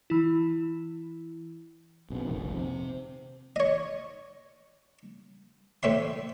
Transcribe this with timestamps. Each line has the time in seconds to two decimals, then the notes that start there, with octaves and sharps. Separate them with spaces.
0.10 E3 E4
2.10 B1 F#2 C3
2.27 F1 A#1 D#3
2.52 C3
3.56 C#5 D#5
5.83 A2 C4 E5 C6